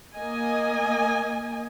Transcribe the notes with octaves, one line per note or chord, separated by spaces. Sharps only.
A#3 D#5 G#5